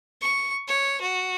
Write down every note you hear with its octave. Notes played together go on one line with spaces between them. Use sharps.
C#6
C#5
F#4